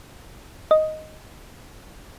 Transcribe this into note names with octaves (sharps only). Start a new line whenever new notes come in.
D#5